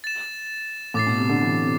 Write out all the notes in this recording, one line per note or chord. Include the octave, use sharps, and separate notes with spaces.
A6 E7
A2 D6 A6 C7
B2
C3
D3
E3
C3